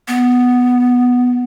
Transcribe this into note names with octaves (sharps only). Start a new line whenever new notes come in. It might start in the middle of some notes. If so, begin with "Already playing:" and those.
B3